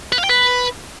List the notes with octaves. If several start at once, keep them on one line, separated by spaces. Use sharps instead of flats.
B4
F5
G5
B4